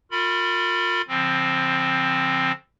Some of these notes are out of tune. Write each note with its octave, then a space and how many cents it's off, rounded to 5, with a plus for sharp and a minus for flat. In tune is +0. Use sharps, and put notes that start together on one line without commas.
F4 +30 A#4 -30 B5 +0
D3 -30 F3 +10 C4 +10